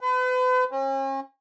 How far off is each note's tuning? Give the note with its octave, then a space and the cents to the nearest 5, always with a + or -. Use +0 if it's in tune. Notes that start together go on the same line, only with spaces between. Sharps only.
B4 +40
C#4 -40